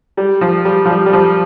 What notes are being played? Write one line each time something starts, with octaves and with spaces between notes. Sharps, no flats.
G3
F3
G3
F3
G3
G3
F3